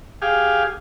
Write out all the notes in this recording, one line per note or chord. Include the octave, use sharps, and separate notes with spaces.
G4 G#4 F5